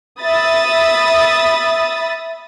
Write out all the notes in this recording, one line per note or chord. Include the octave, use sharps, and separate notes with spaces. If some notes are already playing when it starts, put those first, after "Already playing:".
E5 B5 D#6 A6